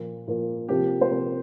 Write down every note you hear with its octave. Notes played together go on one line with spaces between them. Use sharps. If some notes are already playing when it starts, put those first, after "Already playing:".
Already playing: A#2 F3 A#3
A#2 F3 A#3
C3 F3 A#3 G4
C5
C3 F3 A#3 A#4